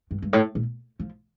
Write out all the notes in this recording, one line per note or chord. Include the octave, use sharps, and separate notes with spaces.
G2
G2
A2
A#2
F3